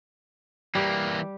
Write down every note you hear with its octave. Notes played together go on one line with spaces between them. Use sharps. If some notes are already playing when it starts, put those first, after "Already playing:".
E3 G3 A#3 G4